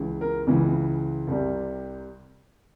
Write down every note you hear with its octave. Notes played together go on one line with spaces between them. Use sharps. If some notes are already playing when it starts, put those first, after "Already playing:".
Already playing: C#2 C#3 E3
A#4
C#2 C#3 E3
C2 C3 G3